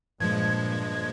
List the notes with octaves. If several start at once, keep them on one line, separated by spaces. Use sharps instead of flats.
G2 A#2 F3 G#3 G#6